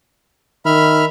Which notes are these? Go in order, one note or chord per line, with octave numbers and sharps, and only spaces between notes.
D#3 E5 B5 F6